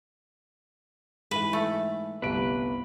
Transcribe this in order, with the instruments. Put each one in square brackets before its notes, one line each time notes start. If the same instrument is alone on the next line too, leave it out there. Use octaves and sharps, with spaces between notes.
[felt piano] G#2 E3 [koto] B4
[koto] A3
[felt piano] G1 C2 D7 [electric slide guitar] B4